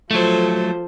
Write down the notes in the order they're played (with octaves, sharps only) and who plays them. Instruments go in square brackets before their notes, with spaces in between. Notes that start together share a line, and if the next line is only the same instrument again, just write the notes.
[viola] F3 [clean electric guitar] F#3 A3 [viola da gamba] A4 C5